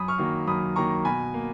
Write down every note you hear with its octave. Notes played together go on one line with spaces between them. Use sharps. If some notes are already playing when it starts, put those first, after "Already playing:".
Already playing: F#2 B5 D#6
C#6 F6
D#3 F#3 A#3
F#2 B5 D#6
D#3 F#3 A#3 A#5 C#6
B2 G#5 B5
A#3